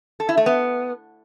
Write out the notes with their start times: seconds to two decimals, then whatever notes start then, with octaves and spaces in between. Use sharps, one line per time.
0.20 A4
0.29 E4
0.37 A3
0.46 B3